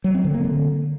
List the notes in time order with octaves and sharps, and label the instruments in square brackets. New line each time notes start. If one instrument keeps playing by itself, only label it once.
[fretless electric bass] F#3
C4
D3
A#3
D3